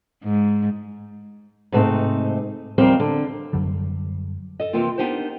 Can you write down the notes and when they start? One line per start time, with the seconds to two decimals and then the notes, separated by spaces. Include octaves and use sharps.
0.24 G#2
1.72 G#2 C3 A3 A#3 C4 D#4
2.78 D#2 F3 G3 C4 A#4 C5
3.00 D3
3.53 F#2 D3 F#3 G3
4.60 A4 D#5
4.73 C3 E3 F3 A#3 C4 F4
4.98 B3 D4 D#4 G4 A#4 C5